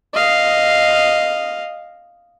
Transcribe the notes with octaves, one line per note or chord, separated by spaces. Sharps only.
D#5 F5